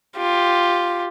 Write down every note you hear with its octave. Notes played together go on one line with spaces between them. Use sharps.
F4 G4